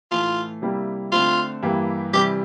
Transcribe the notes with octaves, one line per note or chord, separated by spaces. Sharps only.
A2 E3 A3 F4
C3 G3 A#3 E4
D3 A3 C4 F4
G2 E3 A#3 E4 G4
C3 E3 G3 G4